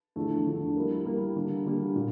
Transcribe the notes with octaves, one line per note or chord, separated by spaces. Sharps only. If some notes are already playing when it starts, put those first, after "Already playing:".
E2 D3 F3 A3 D4
E2 D3 F3 A3 D4
G3 A#3 E4 A#4
G3 A#3 E4 A#4
D3 G3 A#3
D3 G3 A#3
A#2